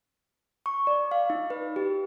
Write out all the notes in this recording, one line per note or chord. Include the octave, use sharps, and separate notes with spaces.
C#6
D5
F5
D#4
B4
G4